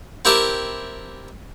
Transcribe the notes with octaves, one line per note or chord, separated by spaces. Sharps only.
C4 E4 G4 A#4 E5 A5